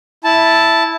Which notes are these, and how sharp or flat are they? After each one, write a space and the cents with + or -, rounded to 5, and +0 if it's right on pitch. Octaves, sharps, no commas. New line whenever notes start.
E4 +0 A5 +0